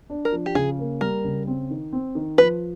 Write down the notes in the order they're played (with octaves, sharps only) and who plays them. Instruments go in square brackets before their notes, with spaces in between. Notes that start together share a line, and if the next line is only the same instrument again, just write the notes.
[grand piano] D4
[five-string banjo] A#4
[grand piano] F3
[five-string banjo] G4
[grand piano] C#3 [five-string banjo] G#4
[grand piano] A#3
[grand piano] G3 [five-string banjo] A#4
[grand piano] C#3
C4
D#3
C4
D#3
[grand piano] F3 [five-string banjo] B4